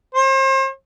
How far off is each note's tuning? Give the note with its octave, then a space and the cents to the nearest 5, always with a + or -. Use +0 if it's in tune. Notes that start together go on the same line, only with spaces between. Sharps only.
C5 +40